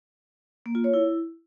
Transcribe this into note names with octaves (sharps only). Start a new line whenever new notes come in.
A#3
F4
C#5
E4